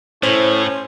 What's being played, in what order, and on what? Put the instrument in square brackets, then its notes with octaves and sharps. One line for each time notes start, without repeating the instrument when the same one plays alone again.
[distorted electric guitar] A2 [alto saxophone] C#4 [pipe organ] E4 A4 C#5 [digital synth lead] C5